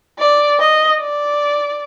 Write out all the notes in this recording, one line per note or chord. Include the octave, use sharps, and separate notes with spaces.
D5
D#5
D5